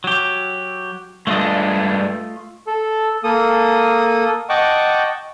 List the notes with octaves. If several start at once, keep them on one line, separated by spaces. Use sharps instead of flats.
F#3 G4
G2 G#3 A3 D4 F4 D#5
A4
A#3 A4 D#6
D#5 F#5 G5 A5 C#6 D6